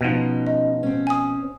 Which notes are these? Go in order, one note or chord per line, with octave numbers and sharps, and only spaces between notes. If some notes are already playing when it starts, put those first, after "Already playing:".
B2 F3 B3 C#4 D#4
D#5
C4 C#4
G#5 D#6